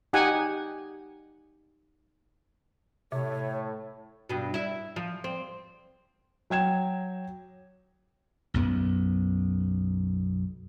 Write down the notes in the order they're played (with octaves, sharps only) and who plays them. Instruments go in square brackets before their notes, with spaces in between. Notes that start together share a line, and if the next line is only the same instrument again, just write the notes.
[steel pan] D#4 G4 F#5 G#5
[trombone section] A2 A3 [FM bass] C3 [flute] C#5
[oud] G2 B2
E4 E5
F3
C4
[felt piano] F#3 G5 G#6 E7
[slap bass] B1 F#2 B3